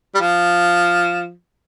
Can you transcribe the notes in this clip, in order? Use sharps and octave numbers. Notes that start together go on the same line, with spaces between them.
G3
F3